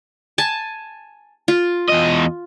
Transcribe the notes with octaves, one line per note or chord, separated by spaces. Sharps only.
G#5 A5
F4
E2 D#5